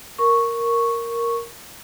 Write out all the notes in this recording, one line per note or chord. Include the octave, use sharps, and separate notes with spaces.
A#4 C#6